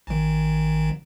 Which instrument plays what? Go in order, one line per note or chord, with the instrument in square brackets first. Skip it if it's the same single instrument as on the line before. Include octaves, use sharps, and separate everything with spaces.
[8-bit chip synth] A1 D#3